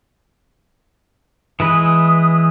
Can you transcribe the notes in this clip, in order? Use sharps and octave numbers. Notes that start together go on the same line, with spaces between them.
E3 G#3 B4 D#6